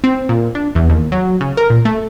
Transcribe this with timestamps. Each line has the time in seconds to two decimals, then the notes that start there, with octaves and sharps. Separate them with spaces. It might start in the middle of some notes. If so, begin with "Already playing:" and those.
0.04 C4
0.29 A#2
0.55 D4
0.75 E2
0.90 D#2
1.12 F#3
1.41 C#3
1.57 A#4
1.70 A#2
1.85 A3